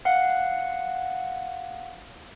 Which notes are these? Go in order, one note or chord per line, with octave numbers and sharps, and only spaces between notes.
F5 F#5